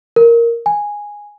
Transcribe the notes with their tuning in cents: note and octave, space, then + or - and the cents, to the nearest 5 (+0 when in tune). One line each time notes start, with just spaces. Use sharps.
A#4 +0
G#5 -5